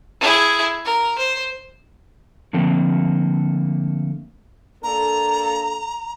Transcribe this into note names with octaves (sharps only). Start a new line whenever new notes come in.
E4 G#4
A#4
C5
D3 F3 A3 A#3 C4
A#3 D4 A4 A#5